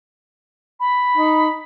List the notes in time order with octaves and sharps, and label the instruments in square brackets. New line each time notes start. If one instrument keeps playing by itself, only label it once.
[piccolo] B5
[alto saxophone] D#4